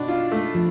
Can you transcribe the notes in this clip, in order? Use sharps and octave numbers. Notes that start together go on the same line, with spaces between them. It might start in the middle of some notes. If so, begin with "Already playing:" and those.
Already playing: B2 D4
F4
A3
F3